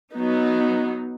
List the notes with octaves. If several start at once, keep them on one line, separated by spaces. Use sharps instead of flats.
F#3 B3 D#4